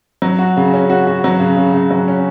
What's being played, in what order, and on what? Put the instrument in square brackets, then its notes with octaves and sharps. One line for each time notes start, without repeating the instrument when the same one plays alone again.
[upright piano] F#3
F#4
C#3
C#4
F#4
F#4
F#3
C#3
C#3
C#3
F#3
C#4